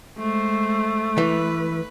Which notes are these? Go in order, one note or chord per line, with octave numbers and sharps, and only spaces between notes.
G#3 A3 C5
E3 B4